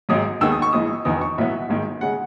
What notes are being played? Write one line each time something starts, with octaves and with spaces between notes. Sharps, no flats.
G#1 G#2 F#3 D#6
D#2 D#3 G#3 B3 E6
D#6
C#6
G#1 G#2 E3 D#6
E1 E2 D#3 D#6
C#6
B1 A2 F#3 B3 E5
G#1 G#2 D#3
C#3 G#3 F#5